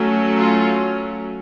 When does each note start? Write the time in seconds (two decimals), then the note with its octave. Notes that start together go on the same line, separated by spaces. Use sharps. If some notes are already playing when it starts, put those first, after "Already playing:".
Already playing: F#3 A3 C#4
0.37 F4